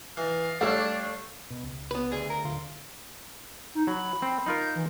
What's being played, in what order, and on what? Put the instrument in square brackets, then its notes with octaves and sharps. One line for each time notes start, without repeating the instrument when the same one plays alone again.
[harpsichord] E3 [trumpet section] D5 D#5 F5
[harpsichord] G3 [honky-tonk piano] A3 C#5 D5 [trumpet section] D4 [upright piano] F5 E6 F6
[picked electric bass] B2
C#2
[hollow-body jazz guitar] B3 B4
[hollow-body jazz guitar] D2 [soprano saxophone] G#4
[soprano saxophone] A#4
[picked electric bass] D1 D3 [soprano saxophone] F4
[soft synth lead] D#4
[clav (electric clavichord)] F#3 [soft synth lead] B5
[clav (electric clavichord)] C4
D#4 F4 A#4
[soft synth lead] G6
E3